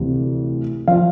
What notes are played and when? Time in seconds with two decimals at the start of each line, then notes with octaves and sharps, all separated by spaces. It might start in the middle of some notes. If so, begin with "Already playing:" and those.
Already playing: D2 C3 E3
0.88 F3 F5